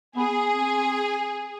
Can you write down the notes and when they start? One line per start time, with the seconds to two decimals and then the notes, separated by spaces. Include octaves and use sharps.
0.16 B3 G#4
0.51 C4